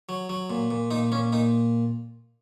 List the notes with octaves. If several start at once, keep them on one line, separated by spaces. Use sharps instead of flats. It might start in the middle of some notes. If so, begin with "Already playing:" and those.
F#3
F#3
A#2
A#2
A#2 D#4
A#2 C#4
A#2 D#4